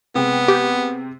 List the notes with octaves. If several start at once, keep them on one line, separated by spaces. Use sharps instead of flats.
C3 G#3 B3 G5
G4